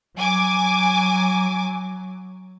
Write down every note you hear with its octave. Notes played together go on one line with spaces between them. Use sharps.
F#3 G#5 D6